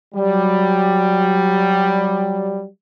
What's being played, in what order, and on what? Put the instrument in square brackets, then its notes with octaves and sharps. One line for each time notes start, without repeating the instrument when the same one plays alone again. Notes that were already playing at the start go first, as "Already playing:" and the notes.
[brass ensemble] F#3 G3